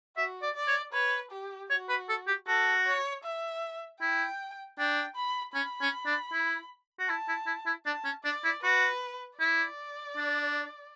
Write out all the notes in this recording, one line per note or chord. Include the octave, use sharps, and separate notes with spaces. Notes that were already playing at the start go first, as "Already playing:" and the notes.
F#4 E5
D5
D5
C#5
B4 C#5
G4
F#4 C#5
B4
A4
G4
F#4 A4
C#5
E5
E4 G5
D4 G5
B5
C#4 B5
C#4
D4
E4
F#4
E4 A5
E4
E4
E4
D4 A5
C#4
D4 D5
E4
F#4 B4
E4 D5
D4